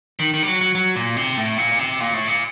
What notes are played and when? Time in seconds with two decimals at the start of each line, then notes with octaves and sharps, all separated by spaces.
0.19 D#3
0.34 D#3
0.43 G3
0.48 F#3
0.61 F#3
0.75 F#3
0.96 A#2
1.17 C3
1.37 A2
1.58 A#2
1.79 C3
2.00 A#2
2.14 A2
2.28 A#2